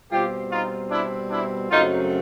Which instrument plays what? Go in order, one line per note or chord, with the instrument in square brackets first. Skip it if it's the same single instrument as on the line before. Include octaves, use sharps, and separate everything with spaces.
[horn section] B2 G3 C4 F4 G4
D#4 F4
D4 E4
D4 E4
F#2 C#3 F#3 A3 C4 D#4 F4